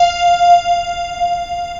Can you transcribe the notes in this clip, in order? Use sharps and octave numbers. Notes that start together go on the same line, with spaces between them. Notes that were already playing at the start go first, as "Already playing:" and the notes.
Already playing: F5